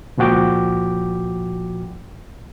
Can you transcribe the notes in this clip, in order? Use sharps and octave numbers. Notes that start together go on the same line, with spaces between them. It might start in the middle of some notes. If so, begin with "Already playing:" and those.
C#2 A#2 F3 F#4 G5 D6